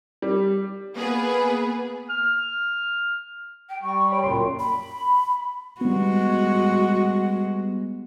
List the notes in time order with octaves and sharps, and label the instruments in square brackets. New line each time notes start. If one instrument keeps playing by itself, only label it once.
[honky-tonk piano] G3
[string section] A#3 B3 G#4 B4
[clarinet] F6
[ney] G5
[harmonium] G3 [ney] C#6
[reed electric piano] C#5 B5 [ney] G5
[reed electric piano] C#2 C6 [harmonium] F#2 A#2
[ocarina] B5
[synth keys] G3 B3 [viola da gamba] G#3 F#4